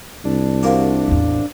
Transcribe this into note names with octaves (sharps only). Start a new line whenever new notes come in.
C2 D4
C3 A#3 F#4
A1 E2